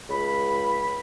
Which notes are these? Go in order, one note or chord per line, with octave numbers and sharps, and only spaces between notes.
C#2 B5